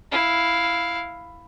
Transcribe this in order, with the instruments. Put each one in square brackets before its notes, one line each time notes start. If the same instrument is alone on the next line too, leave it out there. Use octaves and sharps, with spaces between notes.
[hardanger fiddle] E4 F5